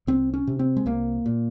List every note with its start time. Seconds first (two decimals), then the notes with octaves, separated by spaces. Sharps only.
0.07 C2 C4
0.34 C#4
0.47 C3
0.59 C4
0.77 G#3
0.86 C2 A#3
1.26 A#2